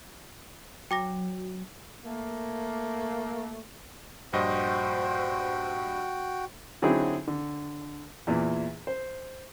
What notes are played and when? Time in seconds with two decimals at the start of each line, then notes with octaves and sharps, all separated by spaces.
0.91 F#3 G5 D6 A#6
2.04 A3 A#3
4.33 A#1 G2 F#4 C5 D#5 G5
6.82 D3 F#3 C4 D#4 E4 G#4
7.27 D3
8.27 E2 A#2 E3
8.87 C5